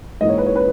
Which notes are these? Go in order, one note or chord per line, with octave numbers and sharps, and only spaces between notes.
G#2 E3 A#3 D#4 D#5
C#5
B4
C#5
B4